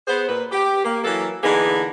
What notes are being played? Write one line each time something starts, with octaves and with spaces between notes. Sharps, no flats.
B3 G#4 C5
A#2 B4
G4
A#3
E3 F#3 A#3 A4 A#4
D3 E3 A#3 B3 D#4 G#4